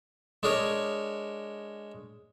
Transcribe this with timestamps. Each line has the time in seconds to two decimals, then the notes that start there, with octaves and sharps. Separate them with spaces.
0.43 G#3 D4 G#4 A#4 C#5